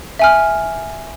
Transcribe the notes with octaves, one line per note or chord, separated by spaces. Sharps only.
E5 G#5 F6